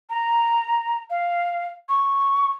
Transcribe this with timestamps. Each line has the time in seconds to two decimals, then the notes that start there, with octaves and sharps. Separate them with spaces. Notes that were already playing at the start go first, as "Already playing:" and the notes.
0.10 A#5
1.10 F5
1.89 C#6